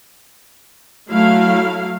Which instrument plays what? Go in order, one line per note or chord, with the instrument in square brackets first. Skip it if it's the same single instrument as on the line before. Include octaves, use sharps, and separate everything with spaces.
[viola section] F#3 A3 E4 F5